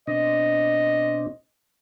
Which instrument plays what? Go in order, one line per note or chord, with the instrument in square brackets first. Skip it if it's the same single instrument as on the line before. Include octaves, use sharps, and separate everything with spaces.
[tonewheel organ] B2 C4 D4 [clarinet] D#5